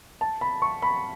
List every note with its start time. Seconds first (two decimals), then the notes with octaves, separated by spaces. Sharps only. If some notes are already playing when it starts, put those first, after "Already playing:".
0.21 A5
0.41 B5
0.62 C#6
0.82 B5